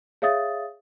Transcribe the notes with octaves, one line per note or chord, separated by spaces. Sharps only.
G#4 C#5 E5 F5 D#6 A6